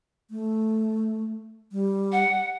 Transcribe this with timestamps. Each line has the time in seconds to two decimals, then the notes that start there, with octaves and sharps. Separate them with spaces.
0.31 A3
1.72 G3
2.12 F#5